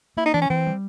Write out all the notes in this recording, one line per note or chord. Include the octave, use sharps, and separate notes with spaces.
A#3 E4
D#4
E3 D4
C#4
E3 C4
G3